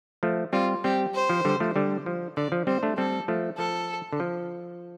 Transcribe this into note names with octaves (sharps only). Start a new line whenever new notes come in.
F3 A3
G3 C4 F4
G3 C4 G4
C5
F3
D3 G3
F3 A3
D3 G3
F3
D3 D5
F3
G3 C4 C5
A3 D4
G3 C4 A4
F3 A3
F3 A4
D3
F3